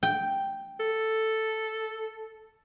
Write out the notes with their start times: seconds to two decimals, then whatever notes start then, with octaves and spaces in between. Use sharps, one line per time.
0.03 G5
0.80 A4